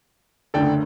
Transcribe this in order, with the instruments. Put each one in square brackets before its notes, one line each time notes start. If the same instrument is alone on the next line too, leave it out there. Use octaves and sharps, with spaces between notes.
[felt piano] F#1 D2 D3 [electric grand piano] A4 D5 G5